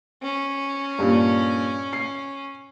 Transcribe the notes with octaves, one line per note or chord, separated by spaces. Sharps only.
C#4
G2 A#2
C7